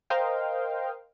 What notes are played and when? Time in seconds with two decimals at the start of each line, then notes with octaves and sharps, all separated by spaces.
0.10 A#4 C5 D#5 F5 G5